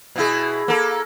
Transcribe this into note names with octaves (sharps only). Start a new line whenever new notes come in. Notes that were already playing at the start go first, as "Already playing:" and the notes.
B2 E4 G#4
A#3 A4